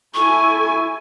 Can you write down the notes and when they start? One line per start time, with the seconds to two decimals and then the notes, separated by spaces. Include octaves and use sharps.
0.14 E4 A4 G#5 C#6